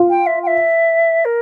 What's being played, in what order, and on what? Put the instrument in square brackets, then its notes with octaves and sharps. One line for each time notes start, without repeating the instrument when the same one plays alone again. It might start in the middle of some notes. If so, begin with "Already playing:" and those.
Already playing: [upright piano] F4
[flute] G5
E5
G5
E5
A#4